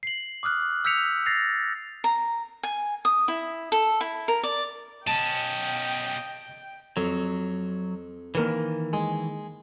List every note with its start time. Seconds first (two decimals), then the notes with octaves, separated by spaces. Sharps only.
0.03 C7 F#7
0.43 D6 D#6 F6 F#6
0.85 E6 G6 B6 C#7 F7
1.26 A6 A#6 C7 F7
2.04 A#5
2.63 G#5
3.05 D#6
3.28 E4
3.72 A4
4.01 E4
4.28 A#4
4.43 D5
5.07 B2 C#4 D#5 G5 A5
6.97 F2 F#3
8.35 D#3 E3 A#3 A#4 B4
8.93 G#3